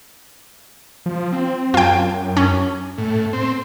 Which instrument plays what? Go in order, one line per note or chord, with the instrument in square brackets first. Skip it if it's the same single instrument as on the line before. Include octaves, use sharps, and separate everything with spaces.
[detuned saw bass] F3
C4
[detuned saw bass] F#2 [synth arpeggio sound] F4 G5
[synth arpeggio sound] C#4
[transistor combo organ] A2
C4